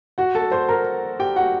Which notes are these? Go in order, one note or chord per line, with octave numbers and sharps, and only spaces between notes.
F#4 F#5
A4 A5
C5 C6
A#4 A#5
G4 G5
F#4 F#5